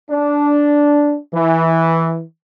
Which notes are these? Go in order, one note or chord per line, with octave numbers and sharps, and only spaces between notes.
D4
E3